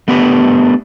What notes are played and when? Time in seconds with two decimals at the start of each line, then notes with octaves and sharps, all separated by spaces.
0.08 A3 B3 D4 G4 B4